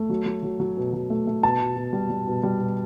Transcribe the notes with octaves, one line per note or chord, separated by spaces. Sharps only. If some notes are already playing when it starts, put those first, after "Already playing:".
Already playing: A3
F#3
F#3
F#3
F#3
B2
F#3
A3
A3
B2 A5
B2
B2
G3
G3
B2
G3
B2